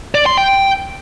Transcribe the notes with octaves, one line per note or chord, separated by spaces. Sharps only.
D5
C6
G5